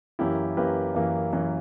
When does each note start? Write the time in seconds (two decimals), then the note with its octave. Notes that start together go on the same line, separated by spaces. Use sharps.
0.19 F#2 E3 A#3 E4 G4
0.57 F#2 E3 A#3 G4 B4
0.94 F#2 E3 A#3
1.33 F#2 E3 A#3